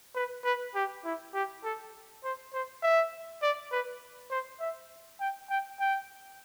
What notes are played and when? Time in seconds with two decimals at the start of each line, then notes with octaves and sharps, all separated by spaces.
0.15 B4
0.44 B4
0.75 G4
1.05 E4
1.34 G4
1.64 A4
2.24 C5
2.53 C5
2.83 E5
3.43 D5
3.72 B4
4.31 C5
4.60 E5
5.20 G5
5.50 G5
5.80 G5